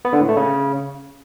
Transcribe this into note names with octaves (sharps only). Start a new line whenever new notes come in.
B3
D3
A2
A3
C#3